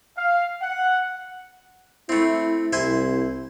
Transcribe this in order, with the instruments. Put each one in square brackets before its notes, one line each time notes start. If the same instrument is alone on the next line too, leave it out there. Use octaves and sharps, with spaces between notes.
[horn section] F5
F#5
[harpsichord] A3 C4 [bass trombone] E4
[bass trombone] C2 [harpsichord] E4 C5 G#5